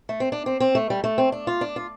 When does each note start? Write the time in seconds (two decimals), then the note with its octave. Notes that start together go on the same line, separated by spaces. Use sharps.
0.09 A3
0.20 C4
0.32 D4
0.46 C4
0.60 C4
0.75 A3
0.90 G3
1.04 A3
1.18 C4
1.32 D4
1.47 F4
1.61 D4
1.76 F4